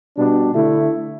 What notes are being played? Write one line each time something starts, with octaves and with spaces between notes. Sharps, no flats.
B2 G3 D4
D3 A3 E4